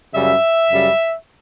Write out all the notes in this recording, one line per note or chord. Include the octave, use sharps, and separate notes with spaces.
F#2 C#3 G3 E5
F#2 C#3 G3